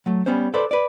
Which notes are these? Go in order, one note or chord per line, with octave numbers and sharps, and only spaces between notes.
F#3 A3
G3 B3 C#4 C5
A4 B4 C5 D5
B4 D5